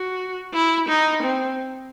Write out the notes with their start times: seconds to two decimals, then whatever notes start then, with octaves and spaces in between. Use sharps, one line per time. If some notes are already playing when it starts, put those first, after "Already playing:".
Already playing: F#4
0.54 E4
0.89 D#4
1.23 C4